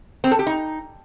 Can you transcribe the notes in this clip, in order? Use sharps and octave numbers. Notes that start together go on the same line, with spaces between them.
C4
A4
G4
D#4